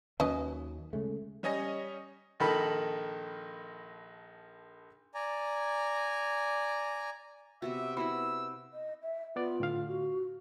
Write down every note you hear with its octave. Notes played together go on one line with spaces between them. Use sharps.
D#2 D#3 F#3 C#4 B4 D#5
C#3 G#3 A3
G3 C#4 D#5 G#5 A#6
A#1 D#3 A4 B5
D5 G#5 A#5
C3 B3 F#4 E5
B3 E4 F#4 D#5 B5 E6
D#5
E5
B3 F4 D5
A2 D3 F5
F#4